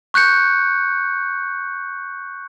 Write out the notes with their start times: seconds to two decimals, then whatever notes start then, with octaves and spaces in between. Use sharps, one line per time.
0.14 C#6 F#6 G6 C#7